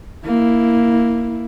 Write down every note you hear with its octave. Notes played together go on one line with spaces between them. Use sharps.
A#3 E4